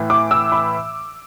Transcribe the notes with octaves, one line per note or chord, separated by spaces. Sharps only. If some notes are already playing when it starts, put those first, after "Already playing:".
Already playing: A2 E3
D6
E6
B5